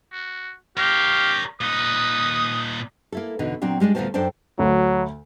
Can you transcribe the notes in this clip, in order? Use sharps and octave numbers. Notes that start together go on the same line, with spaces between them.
F#4
G4 A#4 C#5 F5
A#2 D#4 B4 D#6
A#3 E4 A4
E2 B2 D3 D#4
A#2 F#3 C4 D4 G5
G3 G#3 C4 D4
D2 A#2 B3 C#4 C5 A5
F#2 D4 A4 C5 G5 A5
D2 F#3